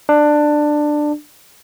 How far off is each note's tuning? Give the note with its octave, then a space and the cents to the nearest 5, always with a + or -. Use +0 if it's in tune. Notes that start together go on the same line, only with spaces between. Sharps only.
D4 +15